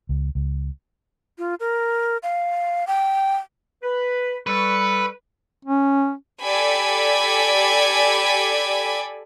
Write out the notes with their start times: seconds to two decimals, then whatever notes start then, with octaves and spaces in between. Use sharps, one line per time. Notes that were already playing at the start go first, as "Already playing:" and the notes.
0.09 C#2
0.35 C#2
1.38 F4
1.60 A#4
2.23 F5
2.87 G5
3.83 B4
4.47 G3 A4 B4 C#6
5.65 C#4
6.43 G4 A4 D5 G#5 B5